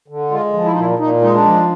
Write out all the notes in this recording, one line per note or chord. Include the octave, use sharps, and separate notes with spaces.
D3
G#3 F4
F3
E4
D#4
A#2 E4
A#2 D#4
G#3 D#4
D4
F3